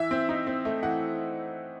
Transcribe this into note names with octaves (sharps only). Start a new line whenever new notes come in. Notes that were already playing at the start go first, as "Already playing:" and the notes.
Already playing: E3 E5
C4
D#4
C4
A3
E3 F#5